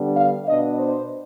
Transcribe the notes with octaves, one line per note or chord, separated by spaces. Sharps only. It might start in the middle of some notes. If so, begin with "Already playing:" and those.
Already playing: D3 G3 B3 D4
F5
B2 B3 D4 D#5
C5